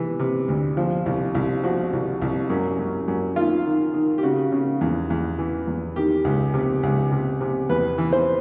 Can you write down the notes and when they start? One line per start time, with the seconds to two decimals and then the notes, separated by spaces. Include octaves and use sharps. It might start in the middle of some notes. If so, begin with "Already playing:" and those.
Already playing: C3 E3
0.19 C3
0.48 D2
0.77 F3
1.06 C2
1.35 C2
1.63 F3 F#4
1.93 C2
2.22 C2
2.50 F#2
2.79 F#2
3.08 F#2
3.36 D#3 F4
3.66 D#3
3.94 D#3
4.18 G4
4.23 C#3 F#4
4.52 C#3
4.81 E2
5.10 E2
5.39 E3
5.67 E2
5.96 D#3 G4
6.25 C#2
6.54 C3
6.83 C#2
7.12 C3
7.41 C3
7.69 E2 B4
7.98 E3
8.13 C5